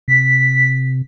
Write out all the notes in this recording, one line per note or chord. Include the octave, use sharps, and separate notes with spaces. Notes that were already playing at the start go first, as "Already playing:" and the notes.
C3 B6